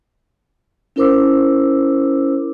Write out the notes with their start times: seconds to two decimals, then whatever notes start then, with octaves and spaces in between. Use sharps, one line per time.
0.96 C#4 E4 A#4 C5 D6 E6